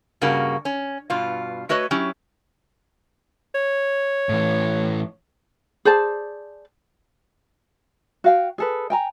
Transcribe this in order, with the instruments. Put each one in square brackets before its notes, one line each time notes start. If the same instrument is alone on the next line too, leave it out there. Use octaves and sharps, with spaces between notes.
[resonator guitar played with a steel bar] G2 C#3 G3 A#3 F#4
C#4
G2 B2 F4
A3 F#4 B4 C#5 D#5
F#3 C#4 E4 G4
[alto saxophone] C#5
[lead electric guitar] A2 E3
[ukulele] G#4 C5 D5 A5
F#4 F5 G5
G#4 A4 B4
G5 G#5 A#5